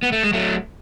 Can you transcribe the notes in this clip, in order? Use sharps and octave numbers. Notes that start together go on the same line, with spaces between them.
B3
A3
G#3
F#3 A3